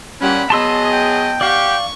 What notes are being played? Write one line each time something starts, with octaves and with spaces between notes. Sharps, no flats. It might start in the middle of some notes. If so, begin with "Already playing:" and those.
A#2 G3 C#4 F#5 B5
F#3 B3 G#4 D#5 A5 C6 E6
G5
G4 D5 F5 F#5 C#6